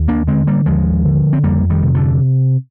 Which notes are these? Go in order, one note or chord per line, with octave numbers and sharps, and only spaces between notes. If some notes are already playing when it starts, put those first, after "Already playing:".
Already playing: D#2
A#3 D4
D3 G#3 C4
G3 A#3
D#2 F3 G#3
D3
C4
F2 G3 A#3
D#3 G3
C3
D3 F3